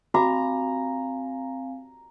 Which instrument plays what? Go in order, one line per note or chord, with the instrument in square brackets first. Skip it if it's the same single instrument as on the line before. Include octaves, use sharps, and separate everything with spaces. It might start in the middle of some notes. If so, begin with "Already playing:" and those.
[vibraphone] C4 F5 G#5 [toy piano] F#4 B5 D6 [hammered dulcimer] A#5